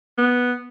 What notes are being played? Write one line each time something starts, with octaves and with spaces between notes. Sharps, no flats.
B3